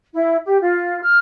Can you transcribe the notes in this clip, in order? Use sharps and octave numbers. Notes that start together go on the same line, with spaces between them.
E4
G4
F4
F6